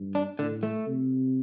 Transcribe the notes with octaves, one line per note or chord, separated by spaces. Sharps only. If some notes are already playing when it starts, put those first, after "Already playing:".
Already playing: G2
D4
A2 D3
A3
C3